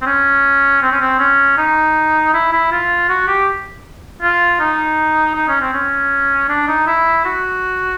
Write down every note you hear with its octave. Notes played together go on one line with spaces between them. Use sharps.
C4
C#4
C4
C#4
C4
C#4
D#4
E4
E4
F4
F#4
G4
F4
D#4
D#4
C#4
C4
C#4
D4
D#4
E4
F#4